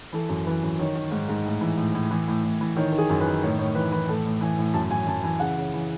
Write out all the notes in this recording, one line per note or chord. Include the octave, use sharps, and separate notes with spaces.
E3 A4
F#2
E3 B4
F#2
D#3 C#5
D#3
G#2
G#2
A2
E3
A2
A2
E3
A2
A2
E3
D#3 C#5
D#3
G#4
F#2
B4
D#3
A2 C#5
A2 C#5
E3 B4
E3 B4
A2 A4
A2
E3 G#5
A2
F#2 A5
F#2 G#5
F#2 A5
E3 G#5
C#3 F#5
C#3
E3